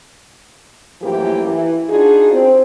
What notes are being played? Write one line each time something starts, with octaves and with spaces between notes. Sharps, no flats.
F#2 A2 E3 F3 A#3 G4
E3
D4 D#4 F4 F#4 G#4
C4